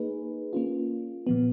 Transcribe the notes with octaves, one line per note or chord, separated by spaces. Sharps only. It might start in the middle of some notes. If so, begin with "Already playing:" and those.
Already playing: A#3 D#4 G#4 B4
A#3 C#4 F4
A#2 F3 B3